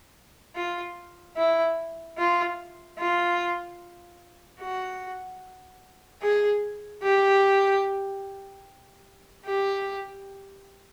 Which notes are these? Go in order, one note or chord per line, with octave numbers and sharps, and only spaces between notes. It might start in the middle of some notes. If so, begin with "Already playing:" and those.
F4
E4
F4
F4
F#4
G#4
G4
G4